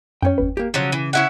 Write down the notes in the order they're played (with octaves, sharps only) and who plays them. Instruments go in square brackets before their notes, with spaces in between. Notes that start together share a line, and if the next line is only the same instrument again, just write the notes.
[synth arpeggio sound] F#2 C#5 [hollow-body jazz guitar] C#4 G5
[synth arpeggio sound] G1 E2 B4
[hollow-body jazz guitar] A#3 G4
[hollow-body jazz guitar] C#3 [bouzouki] F3 F#3
[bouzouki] E3
C#4 E4 F#5